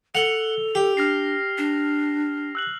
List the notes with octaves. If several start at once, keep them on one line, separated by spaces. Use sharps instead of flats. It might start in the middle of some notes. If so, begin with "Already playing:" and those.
A4 F#5 F7 G7
G4
D4 F6 A#6 C7
D4
E6 F#6 F#7